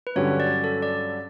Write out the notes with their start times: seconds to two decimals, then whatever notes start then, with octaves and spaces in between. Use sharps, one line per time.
0.07 B4
0.16 G2 D3 F#3 C#4 G4 C#5
0.40 D5
0.64 A4
0.82 D5